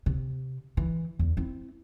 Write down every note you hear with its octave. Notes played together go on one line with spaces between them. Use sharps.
C3
E3
E2
C4 E4